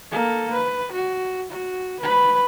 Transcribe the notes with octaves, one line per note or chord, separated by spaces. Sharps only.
A#3 A4
B4
F#4
F#4
B4 B5